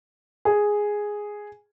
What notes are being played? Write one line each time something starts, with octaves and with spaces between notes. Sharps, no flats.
G#4